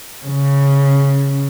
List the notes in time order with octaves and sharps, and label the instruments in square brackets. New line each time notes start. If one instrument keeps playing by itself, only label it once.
[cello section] C#3